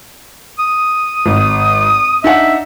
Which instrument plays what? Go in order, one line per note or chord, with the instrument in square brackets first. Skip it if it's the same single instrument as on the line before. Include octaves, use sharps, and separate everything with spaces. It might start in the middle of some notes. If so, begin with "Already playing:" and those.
[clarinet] D#6
[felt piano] G#1
[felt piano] D4 D#4 F#5 [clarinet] E5